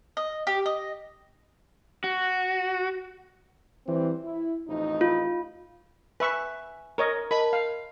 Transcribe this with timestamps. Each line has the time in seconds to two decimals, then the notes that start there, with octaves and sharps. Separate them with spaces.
0.17 D#5
0.47 G4
0.66 D#5
2.04 F#4
3.87 E3 G3 C4
4.24 E4
4.67 A1 F2 D#4
5.01 F4
6.20 B4 E5 G#5 C#6
6.98 A#4 C#5 D#5
7.31 A#4 D#5 A5 B5
7.53 F5